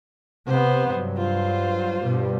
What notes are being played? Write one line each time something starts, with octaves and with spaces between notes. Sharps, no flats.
C3 B3 C5
G2 F#3
F4 C5
G2 B2 G3